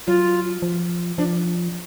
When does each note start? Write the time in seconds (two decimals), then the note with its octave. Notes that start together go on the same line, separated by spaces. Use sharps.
0.07 F#3 F4
0.62 F3
1.18 F3 D4